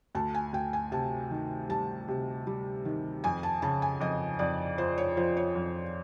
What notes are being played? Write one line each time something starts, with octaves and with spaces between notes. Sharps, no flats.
D2 A5
G#5
D2 G5
G#5
C3 A5
D#3
G3 A5
C3
G3
D#3
F2 G#5
A5
C#3 A5
G#5
F2 D#5
F2 D5
F3 C5
C#5
F3 C5
C#5
F2